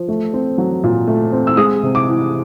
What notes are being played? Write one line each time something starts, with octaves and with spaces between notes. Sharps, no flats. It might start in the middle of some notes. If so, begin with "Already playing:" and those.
Already playing: F3
A3
C4
F#3
A#2
A3
C4
E6
G#3 D#6
C3
D6
E3